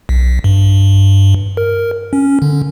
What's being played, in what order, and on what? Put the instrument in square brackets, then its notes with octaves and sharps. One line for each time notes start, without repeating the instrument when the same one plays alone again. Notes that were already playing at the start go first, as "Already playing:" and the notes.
[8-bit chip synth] B1
G2
A#4
C#4
D3